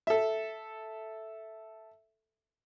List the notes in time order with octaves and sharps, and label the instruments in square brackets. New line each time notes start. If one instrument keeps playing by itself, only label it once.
[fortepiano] A4 E5